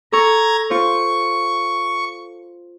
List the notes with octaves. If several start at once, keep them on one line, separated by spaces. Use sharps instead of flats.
A4 A#5 C#6 G#6
F4 C5 C#6